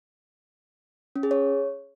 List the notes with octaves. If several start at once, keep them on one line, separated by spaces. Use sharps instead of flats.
C#4
G#4
C#5